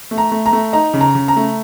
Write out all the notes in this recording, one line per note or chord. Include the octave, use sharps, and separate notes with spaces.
A3
A#5
A3
A#5
A3
D#4 A#5
C#3
A#5
C#3
A#5
A3